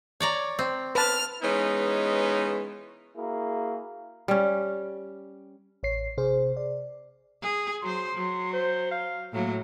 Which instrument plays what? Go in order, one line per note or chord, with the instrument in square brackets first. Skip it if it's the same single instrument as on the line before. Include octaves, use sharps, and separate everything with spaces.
[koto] C#5 D5 A#5
C4
[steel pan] B4 A5 [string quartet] F6
[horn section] E3 G#3 B3 C#4 D#4
[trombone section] A#3 E4 F#4 G#4
[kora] G3 C#4
[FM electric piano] A1 C#5 C7
C3 G#4 C5
D5
[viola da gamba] G#4
[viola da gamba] F#3 C5 [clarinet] C6
[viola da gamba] F#3
[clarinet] C5
F5
[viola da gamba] A2 F#3 [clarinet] A#3